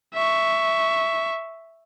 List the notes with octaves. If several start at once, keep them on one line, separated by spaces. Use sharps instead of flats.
E5 C#6